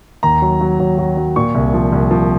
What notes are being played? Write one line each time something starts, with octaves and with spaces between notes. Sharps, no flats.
D#2 A#5
F#3
F#3
F#3
F#3
F#3
A#2 C#6
C2
F3
C2
F3